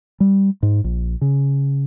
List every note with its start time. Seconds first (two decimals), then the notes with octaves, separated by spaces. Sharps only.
0.20 G3
0.63 G#2
0.84 A#1
1.21 C#3